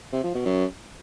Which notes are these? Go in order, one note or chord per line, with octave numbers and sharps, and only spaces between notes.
C3
F3
B2
F#2